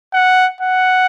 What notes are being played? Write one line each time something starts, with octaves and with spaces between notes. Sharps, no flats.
F#5
F#5